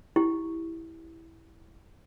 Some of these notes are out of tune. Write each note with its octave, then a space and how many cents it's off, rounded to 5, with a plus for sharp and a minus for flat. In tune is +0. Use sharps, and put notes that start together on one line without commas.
E4 -10 G4 +0